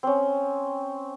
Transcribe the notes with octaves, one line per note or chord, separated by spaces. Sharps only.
C4 C#4